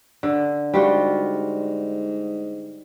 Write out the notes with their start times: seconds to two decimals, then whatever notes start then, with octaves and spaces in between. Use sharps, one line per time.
0.23 D3
0.74 G#2 G3 F4 F#4